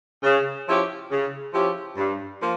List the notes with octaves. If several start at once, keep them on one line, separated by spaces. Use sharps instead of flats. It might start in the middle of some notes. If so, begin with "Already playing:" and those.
C#3
F3 C#4 E4 G4
C#3
F3 C#4 E4 G4
G2
F3 A#3